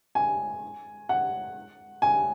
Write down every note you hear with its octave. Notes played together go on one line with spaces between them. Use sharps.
G#5
F#5
G#5